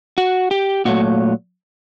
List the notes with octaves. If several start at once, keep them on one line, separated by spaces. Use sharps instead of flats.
F#4
G4
A#2 F#3 A3 F#4